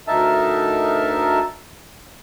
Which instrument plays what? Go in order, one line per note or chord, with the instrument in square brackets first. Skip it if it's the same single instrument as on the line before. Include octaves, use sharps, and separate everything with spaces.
[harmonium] D2 D#4 A#4 E5 A5